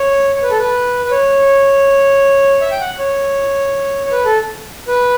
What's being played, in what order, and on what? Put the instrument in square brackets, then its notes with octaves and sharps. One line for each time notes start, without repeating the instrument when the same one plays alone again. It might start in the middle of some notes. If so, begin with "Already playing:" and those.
Already playing: [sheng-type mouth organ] C#5
C#5
B4
A4
B4
B4
C#5
E5
G5
F#5
C#5
C#5
B4
A4
B4